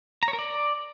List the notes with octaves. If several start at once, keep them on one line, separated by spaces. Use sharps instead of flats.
A#5
C#5
A#4
D5